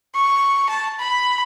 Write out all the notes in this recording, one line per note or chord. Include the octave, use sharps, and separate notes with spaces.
C#6
A5
B5